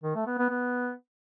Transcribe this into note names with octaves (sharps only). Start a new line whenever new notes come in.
D#3
A3
B3
B3
B3